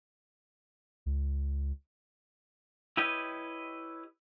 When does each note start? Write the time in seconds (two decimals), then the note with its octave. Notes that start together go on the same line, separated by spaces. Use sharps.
1.06 C#2
2.97 E4 G4 B4 C#5 D#5